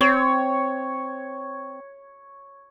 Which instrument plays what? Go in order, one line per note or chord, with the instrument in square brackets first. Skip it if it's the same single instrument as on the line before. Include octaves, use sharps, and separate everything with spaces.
[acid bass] C4 [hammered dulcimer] C#5